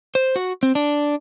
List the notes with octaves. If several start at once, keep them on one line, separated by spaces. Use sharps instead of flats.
C5
F#4
C4
D4